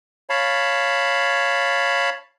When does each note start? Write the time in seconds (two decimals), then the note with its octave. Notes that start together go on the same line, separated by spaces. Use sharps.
0.30 C#5 F5 A5 B5